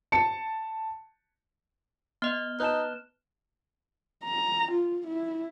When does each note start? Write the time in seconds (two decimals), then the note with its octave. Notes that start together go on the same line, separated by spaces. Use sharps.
0.12 A5 C#7
2.22 B3 D#5 F6 G7
2.60 D#4 B4 A5 F#6 E7
4.25 A#5
4.71 F4
5.07 E4